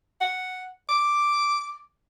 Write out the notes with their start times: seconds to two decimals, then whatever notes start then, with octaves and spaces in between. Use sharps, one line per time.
0.21 F#5
0.89 D6